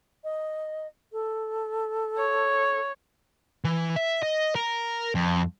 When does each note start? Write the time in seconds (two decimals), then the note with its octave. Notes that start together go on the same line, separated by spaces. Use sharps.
0.24 D#5
1.12 A4
2.18 C#5
3.64 E3
3.96 E5
4.23 D#5
4.55 A#4
5.15 F2